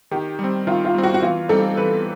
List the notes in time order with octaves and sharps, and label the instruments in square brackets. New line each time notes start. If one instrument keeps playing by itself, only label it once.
[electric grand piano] D#3 [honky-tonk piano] G4
[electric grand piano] G3 C4
[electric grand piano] D#3 [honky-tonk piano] F4
[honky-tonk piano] F4
[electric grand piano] G3 C4
[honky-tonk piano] F#4
F#4
[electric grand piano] E3 [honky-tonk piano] F4
[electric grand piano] G3 C4 D#4 [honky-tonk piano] A4
[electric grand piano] E3 [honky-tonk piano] B4